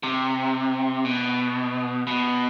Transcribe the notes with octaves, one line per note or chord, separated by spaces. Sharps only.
C3
B2
B2